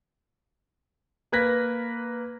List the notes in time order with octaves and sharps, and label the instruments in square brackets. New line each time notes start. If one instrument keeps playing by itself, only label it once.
[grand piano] A#3 B4 F#6 G#6 A#6 B6